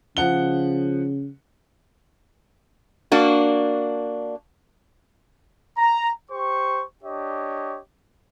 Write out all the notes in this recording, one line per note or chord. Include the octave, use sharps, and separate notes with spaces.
C#3 F3 F#5 G7
A#3 D4 F#4
A#5
G4 C5 C#6
D4 G4 C#5 D#5